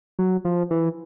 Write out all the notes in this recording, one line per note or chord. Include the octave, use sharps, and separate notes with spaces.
F#3
F3
E3